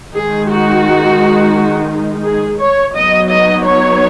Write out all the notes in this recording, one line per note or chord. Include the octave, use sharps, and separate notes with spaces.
D#3 G#3 D#4 G#4
F#4
G#4
C#5
F#3 B3 D#4 D#5
D#5
C#5